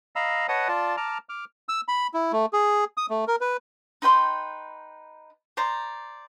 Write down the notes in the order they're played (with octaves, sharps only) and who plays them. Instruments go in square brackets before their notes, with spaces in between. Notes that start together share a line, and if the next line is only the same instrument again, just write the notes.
[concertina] D#5 F5 A#5 B5 E6
B4 C#5 D#5 F#5 A5 D#6
F4 D5 A5
A5 A#5 D6 F6
D6 F6
E6
B5
E4
A3
G#4
D#6
A3
A#4
B4
[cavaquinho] D#4 B4 G5 C6
C5 D5 A#5